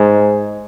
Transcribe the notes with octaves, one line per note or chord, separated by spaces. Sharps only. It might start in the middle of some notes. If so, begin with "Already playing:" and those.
Already playing: G#2